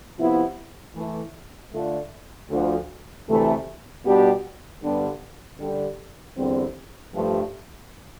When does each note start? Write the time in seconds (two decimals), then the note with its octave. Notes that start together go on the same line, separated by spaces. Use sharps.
0.17 C3 F3 B3 E4
0.94 E3 A3 E4
1.72 D3 A3 D4 F4
2.49 D2 D3 F3
3.27 D2 C3 E3 A3
4.04 B2 G3 B3 D4 G4
4.82 G2 D3 G3 B3 D4
5.59 D3 G3 D4 G4
6.36 E2 D3 G3 C4
7.14 G2 F3 A3